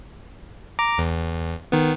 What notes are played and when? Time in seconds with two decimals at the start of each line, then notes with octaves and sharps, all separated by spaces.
0.79 A#5 D6
0.98 E2
1.72 D#3 B3